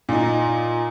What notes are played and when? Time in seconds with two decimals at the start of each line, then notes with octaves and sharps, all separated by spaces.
0.09 A#2 D#4